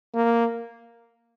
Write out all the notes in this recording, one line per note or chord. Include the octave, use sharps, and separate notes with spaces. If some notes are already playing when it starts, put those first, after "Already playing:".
A#3